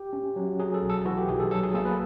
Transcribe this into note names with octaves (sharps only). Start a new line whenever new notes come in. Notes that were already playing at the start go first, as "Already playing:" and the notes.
Already playing: G4
C#4
F#3
F#3 G#4
A4
B1
A4
E3 F#4
G4
B1 G#4
A4
F#3 A4
G#4
A#3 A4
B4